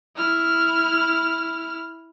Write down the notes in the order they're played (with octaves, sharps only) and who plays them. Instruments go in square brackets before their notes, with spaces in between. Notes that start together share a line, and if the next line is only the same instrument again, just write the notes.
[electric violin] E4 F6